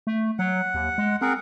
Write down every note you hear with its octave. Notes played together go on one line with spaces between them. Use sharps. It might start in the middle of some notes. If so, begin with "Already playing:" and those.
A3
F#3 F#5
D#2
G#3
C4 G#4 A#4 F#5